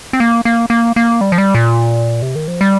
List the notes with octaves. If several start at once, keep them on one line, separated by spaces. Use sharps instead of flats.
C4
A#3
A#3
A#3
A#3
G3
F3
G3
A#2
C3
D#3
F3
G3